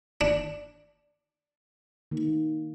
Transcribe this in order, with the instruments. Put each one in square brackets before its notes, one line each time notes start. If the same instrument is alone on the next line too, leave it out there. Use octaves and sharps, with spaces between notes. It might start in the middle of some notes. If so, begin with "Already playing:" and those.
[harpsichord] D4
[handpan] D#3 A#3